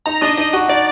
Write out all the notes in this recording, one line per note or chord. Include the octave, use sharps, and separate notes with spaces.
D#4 A#5
D4 D#5
D#4 D#5
F#4
D#4 D5